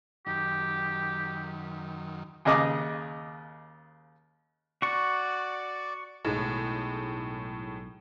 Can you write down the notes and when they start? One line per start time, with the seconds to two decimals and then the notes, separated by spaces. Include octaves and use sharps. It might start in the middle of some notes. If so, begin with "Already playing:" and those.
0.26 F#2 D#3 G4
2.45 D#2 C#3 D#5 D6
4.82 F#4 D5 C#6
6.25 B1 A2 D#3 G#3